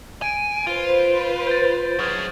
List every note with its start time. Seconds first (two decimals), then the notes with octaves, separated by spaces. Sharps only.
0.22 G#5 G#6 D7 D#7
0.67 F4 B4 C5
1.47 G6 A6
1.99 F#3 G#4 C#6 F6 G#6